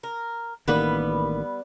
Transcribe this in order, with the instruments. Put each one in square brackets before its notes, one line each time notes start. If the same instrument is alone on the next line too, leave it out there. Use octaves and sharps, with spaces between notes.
[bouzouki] A#4
[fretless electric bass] A1 D#3 A#3 [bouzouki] G3 B3 B4